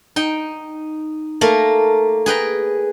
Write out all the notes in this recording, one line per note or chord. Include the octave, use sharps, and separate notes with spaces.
D#4 G5
A3 A#3 A#4
G#4 B4 G5 A#5